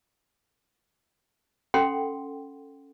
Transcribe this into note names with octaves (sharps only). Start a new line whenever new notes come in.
C#4 A4 F#5 G5 B5 C6